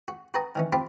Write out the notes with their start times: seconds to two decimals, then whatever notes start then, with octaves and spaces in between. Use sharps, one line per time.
0.08 F#4
0.34 F#4 B4 G5 A5 A#5 D#6
0.55 D#3 E3 C#4
0.73 C4 F4 G4 A5 B5